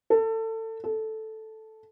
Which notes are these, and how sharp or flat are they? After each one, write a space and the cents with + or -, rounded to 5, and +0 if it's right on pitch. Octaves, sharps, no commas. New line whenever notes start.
A4 +25
A4 -5